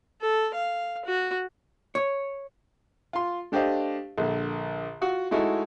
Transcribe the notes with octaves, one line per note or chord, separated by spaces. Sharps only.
A4
F5
F#4
C#5
F4 C6
A3 D4 G4 C5 D#5 F5
A#1 D3
F4 F#4 F#5
G#3 A3 D#4 E4 F#4 A4